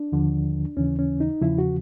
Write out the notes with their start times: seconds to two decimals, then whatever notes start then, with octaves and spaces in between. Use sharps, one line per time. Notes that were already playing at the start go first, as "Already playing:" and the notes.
Already playing: D4
0.12 D#2 D3 F3
0.77 D#2 C#3 E3 C#4
0.99 C#4
1.20 D#4
1.41 E2 C#3 F3 E4
1.58 F#4